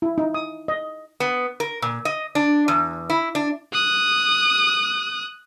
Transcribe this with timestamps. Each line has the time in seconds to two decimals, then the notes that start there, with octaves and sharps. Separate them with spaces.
0.02 E4
0.18 D#4
0.34 D#6
0.68 D#5
1.20 B3
1.60 A#4
1.82 A#2
2.05 D#5
2.35 D4
2.68 E2
3.10 E4
3.35 D4
3.73 D#6 F#6